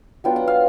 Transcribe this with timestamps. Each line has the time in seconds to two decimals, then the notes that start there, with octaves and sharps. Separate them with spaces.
0.24 F#3 B3 D4 F4 G5
0.36 F#5
0.48 F5